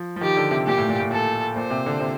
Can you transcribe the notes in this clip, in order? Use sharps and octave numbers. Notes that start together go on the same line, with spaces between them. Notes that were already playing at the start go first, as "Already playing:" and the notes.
Already playing: F3
F3
D#3 G4
D3
C3
A#2 G4
A2
A#2
A2
A#2 A4
A#2 C5
C3
D3
C3